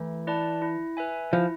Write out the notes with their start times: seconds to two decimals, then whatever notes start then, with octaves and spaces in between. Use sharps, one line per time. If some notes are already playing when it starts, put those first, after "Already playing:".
Already playing: E3 A3
0.27 E4 B4 D5 A5
0.62 E4
0.97 B4 E5 G#5
1.33 F3 E4